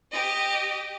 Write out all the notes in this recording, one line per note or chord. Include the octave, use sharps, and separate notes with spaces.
G4 D#5